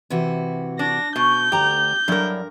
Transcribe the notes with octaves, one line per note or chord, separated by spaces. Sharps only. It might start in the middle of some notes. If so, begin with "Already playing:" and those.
C3 E3 F#4
D4 A#6
B2 G6
D2 G4 A#5
G2 F#3 D4 E4 A#4